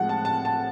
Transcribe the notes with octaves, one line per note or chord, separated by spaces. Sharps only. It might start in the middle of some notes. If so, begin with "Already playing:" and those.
Already playing: A2 F3 G#3 F#5
A5
A5
A5